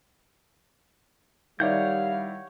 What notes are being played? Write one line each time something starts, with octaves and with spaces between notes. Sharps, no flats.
D#3 G3 E4 C#5 D5 F5 F#5 G6